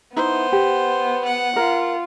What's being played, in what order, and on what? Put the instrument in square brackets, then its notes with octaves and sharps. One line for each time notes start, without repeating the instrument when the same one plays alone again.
[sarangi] B3 [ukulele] D#4 E4 [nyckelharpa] C5
[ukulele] G4
[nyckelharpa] F#5
[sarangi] F4 [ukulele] A#4